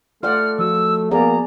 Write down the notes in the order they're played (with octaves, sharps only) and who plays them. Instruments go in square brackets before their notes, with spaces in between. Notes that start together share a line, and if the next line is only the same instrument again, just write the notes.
[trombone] A3 [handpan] F4 D5 F#5 [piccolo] F6
[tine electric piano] F3 F#4 [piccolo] E6
[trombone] A#3 [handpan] B3 G#4 D5 [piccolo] A#5